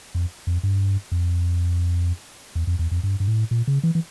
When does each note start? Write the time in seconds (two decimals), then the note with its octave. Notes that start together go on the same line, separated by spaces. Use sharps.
0.15 F2
0.47 F2
0.63 G2
1.12 F2
2.55 E2
2.67 F2
2.79 E2
2.91 F2
3.03 G2
3.20 G2
3.28 A2
3.51 A#2
3.67 C#3
3.83 E3
3.95 E3